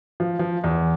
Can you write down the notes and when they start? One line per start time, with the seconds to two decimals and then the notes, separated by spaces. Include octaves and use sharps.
0.20 F3
0.39 F3
0.64 E2